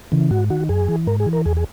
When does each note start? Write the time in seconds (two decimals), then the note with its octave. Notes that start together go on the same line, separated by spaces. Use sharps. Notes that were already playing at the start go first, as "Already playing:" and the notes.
0.12 C#3 E3
0.31 G#2 F#4
0.50 D#3 F#4
0.69 F#2 G#4
0.88 E3
1.07 G#2 A#4
1.20 G#4
1.26 E3
1.33 A#4
1.45 E2 G#4
1.57 G#4